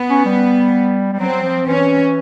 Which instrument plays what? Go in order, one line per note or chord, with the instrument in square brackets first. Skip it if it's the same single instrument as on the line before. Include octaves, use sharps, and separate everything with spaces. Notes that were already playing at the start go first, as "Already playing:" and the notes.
Already playing: [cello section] B3
[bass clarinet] C#4
G3
G3
[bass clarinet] F#3 [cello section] C4
[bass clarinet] F3
[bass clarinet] E3 [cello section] C#4